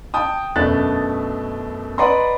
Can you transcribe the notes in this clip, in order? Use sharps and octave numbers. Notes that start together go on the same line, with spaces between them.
G5 A5 D#6
F#2 B2 A3 D4 F#6 A6
B4 D5 D#5 F#5 A#5 C6